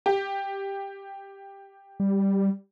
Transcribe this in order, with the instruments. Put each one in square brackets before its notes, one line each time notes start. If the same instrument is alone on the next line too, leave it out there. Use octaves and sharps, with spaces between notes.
[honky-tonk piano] G4
[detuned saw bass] G3